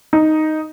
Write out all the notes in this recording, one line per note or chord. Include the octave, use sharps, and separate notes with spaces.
D#4